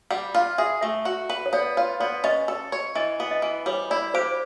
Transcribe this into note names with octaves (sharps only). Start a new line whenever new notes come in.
G3 F#5
F4 F5
G#4 E5
A3 E5
F#4
B4
C#5
B3 D5
F4 C#5
B3 D5
C#4 D#5
A4
C#5
E3 D#5
B3
D#5
E3
G3 C#5
E4 D5
G4 C5